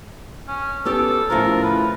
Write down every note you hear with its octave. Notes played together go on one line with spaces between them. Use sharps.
C#4
B3 C#4 G4 A4
A2 C#3 F3 A#4
B4